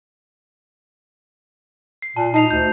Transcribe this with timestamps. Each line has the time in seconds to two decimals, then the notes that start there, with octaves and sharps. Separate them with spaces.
2.02 C7
2.16 A#2 A5
2.34 D#4 A5 C7 F7
2.51 D2 G6